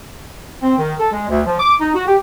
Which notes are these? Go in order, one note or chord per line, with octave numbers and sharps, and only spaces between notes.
C4
D#3
A4
G#3
D2
F3
D6
D#4
F#4
G4